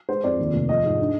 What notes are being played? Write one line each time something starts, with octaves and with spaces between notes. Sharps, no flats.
G#3 C5
F2 D5
D#2
F1
F3 D#5
G#2
D4